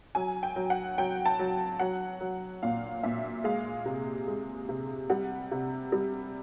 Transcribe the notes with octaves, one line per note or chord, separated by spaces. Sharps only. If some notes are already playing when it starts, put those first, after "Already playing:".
F#3 G#5
G5
F#3
F#5
F#3 G5
A5
F#3
F#3 F#5
F#3
A#2 F5
A#2 E5
G#3 F5
C3
G#3
C3
G3 F#5
C3
G3